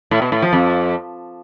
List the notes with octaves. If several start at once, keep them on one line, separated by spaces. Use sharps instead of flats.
A2
B2
A2
F3
F2